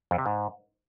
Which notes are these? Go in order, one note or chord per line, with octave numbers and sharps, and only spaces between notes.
F2
C3
G#2